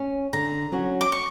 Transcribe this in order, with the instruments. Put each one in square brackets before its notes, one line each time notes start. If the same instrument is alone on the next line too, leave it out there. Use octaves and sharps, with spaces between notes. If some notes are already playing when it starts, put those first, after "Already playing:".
Already playing: [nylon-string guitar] C#4
[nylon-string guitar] D3 [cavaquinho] A#5
[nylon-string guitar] F#3 C#4 F#4
[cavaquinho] D6
C#6